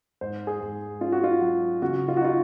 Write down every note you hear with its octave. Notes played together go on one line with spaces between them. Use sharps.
G#2 C5
G#4
G#2
C#4 F4
F#4
F4
F#3 F#4
C#3 F#4
F4
F#4
D#4 F4